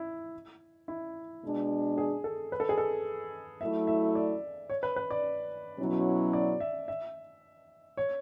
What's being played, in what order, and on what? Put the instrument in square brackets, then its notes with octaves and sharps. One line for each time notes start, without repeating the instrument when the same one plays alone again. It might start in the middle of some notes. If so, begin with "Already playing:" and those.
Already playing: [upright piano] E4
E4
[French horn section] B2 G#3 D4
[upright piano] G#4
A4
B4
A4
G#4
A4
[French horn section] F#3 A3 E4 [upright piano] E5
[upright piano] E5
D5
C#5
B4
B4
D5
[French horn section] B2 F#3 C#4 E4
[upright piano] D5
E5
E5
C#5